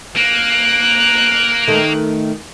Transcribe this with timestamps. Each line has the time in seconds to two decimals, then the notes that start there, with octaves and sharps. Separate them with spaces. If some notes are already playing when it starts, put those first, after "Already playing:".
0.17 A#3 F#6 D7
1.68 D#3 A3